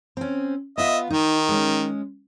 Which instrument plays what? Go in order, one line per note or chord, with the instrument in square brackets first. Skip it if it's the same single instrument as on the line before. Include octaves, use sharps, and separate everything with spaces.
[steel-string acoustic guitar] C4 C#4
[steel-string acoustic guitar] B3 F4 [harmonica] D#5 E5
[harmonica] D#3 [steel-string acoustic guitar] D#4
[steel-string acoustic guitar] G#3 C#4